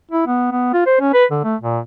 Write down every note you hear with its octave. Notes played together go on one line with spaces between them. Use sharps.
E4
B3
B3
F4
C5
C#4
B4
D3
A3
A#2